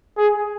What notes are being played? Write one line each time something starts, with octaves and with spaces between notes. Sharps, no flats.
G#4